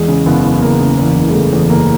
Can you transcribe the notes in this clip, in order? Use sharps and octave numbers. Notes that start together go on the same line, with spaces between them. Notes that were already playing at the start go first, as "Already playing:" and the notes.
Already playing: E2 G#3
C#3
F#1 B3
E2
F#1 A#3
C#3
E2
F#1
G#3
F#1 A3
E2
F#1 A#3